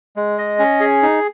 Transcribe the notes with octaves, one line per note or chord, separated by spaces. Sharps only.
G#3
D#5
C#4
G#4
D#4